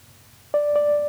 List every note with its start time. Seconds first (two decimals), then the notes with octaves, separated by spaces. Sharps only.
0.54 D5
0.75 D5